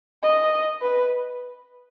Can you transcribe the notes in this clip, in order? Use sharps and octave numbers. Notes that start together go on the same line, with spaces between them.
D#5
B4